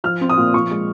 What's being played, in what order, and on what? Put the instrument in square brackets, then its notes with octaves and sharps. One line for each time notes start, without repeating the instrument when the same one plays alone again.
[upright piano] F3 F6
C4
D#6
A#2
F3 C#6
G#3